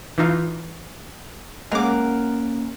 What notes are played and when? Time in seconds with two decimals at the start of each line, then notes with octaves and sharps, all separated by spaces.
0.18 E3 D#4 F4
1.72 G#3 A#3 C#4 A#4 F#5 D6